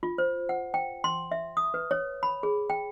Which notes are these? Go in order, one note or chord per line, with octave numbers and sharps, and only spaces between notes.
F4
C5
F#5
G5
C6
E5
D#6
B4
C#5
B5
G#4
G5